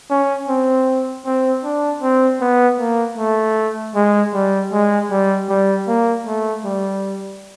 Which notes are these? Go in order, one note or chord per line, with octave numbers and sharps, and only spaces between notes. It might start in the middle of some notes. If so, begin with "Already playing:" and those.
C#4
C4
C4
D4
C4
B3
A#3
A3
G#3
G3
G#3
G3
G3
A#3
A3
G3